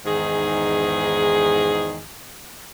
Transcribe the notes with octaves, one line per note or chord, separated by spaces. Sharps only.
E2 G#2 D#3 G#4